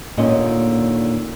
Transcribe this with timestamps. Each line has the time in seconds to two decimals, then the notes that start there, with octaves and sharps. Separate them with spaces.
0.17 D#2 A#2 D3 D#3 C#4 D#5